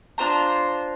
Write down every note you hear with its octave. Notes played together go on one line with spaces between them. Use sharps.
D4 F4 C5 A#5